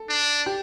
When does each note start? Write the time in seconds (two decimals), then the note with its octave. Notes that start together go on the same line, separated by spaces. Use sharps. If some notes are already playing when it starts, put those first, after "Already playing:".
Already playing: A4
0.09 D4
0.46 G4